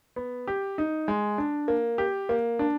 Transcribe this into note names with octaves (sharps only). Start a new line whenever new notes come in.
B3
G4
D#4
G#3
D4
A#3
G4
A#3
D4